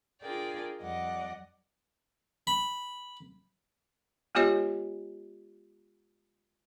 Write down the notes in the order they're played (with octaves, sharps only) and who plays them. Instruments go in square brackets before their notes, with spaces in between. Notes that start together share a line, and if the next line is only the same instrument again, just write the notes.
[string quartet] D4 F4 G#4 A#4 D5 G5
F2 G3 D5 D#5 F#5
[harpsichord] B5
[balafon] G#3 B3 F4 G4 C#5 D#5